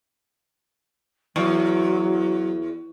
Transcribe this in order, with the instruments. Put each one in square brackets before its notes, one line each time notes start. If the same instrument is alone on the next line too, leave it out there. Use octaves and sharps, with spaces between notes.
[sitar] E2 [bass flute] F#3